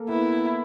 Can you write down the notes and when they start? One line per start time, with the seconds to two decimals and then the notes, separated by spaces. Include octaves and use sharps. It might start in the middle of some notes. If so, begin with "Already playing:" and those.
Already playing: A#3 A4 A#4
0.09 B3 E4 B4